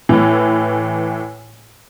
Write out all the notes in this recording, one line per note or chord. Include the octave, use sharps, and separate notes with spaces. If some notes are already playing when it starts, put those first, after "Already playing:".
A2 E3